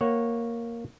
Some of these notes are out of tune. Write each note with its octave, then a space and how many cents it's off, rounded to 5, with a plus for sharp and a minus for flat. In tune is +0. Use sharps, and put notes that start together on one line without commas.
A#3 +0 C#5 -10 F#5 +0